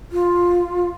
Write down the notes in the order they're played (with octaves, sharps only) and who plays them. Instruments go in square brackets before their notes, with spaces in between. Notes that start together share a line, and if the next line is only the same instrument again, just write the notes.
[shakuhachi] F4